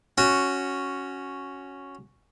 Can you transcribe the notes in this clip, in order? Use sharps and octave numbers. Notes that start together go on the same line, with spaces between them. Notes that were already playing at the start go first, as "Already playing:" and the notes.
C#4 F#4